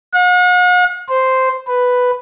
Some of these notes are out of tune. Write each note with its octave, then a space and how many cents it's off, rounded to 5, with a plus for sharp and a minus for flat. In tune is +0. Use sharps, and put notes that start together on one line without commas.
F#5 -45
C5 -5
B4 +5